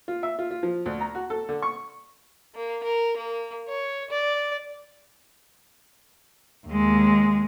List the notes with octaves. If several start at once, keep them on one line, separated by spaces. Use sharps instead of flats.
F4
E5
F4
F4
F3
D2
A#5
F#4
A4
D3
C#6
A#3
A#4
A#3
C#5
D5
D#2 G#3